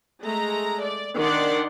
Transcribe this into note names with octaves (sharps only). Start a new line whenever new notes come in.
G#3 A3 A#5
D5
D#3 D4 D5 F#5 C6